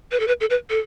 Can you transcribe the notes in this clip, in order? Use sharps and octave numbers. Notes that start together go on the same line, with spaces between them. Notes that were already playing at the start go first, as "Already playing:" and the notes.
B4
A4
B4
A4
B4
A4